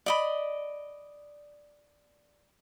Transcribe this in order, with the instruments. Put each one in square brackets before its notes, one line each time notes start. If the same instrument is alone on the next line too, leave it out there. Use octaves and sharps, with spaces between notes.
[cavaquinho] D5 D#5 B5